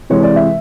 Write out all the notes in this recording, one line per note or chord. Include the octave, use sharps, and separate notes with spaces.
C3 E3 G#3 C#5
D5
E5